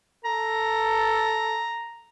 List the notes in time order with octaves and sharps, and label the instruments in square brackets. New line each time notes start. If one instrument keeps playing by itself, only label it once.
[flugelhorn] A4 [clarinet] A#5